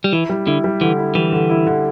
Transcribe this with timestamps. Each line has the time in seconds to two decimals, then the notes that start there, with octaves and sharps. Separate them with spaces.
0.04 G3
0.13 E3 E4
0.29 G3
0.46 D3 E4
0.64 G3
0.81 D3 E3
0.98 E4
1.15 E3 G3
1.32 D3
1.50 E4
1.67 D3